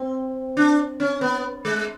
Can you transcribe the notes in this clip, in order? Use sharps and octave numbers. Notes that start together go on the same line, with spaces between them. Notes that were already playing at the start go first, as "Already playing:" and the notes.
Already playing: C4
D4
C#4
B3
G#3